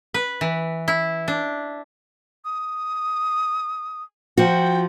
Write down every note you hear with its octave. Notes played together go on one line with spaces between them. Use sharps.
B4
E3
E4
D4
D#6
F3 F#4 G5